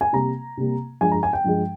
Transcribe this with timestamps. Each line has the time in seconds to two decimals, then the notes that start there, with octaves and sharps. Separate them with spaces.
0.01 G#5
0.13 C3 G3 A#3 A#5
0.57 C3 G3 A#3
1.01 G2 F3 G#3 G#5
1.12 A#5
1.23 G#5
1.33 G5
1.44 G2 F3 G#3